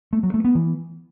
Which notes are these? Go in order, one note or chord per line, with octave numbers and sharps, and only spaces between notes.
A3
F#3
A3
B3
E3